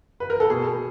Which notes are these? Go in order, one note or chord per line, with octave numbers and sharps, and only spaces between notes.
B4
A#4
A4
B2 G#4